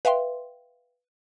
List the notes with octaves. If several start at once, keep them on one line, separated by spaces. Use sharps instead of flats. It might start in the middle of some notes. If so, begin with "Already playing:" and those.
B4 E5 F5 G5 C6